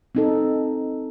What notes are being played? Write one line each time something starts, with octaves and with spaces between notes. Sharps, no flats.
C4 D#4 A4